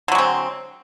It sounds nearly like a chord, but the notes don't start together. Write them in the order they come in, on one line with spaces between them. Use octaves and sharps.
D3 F#3 G#3 C4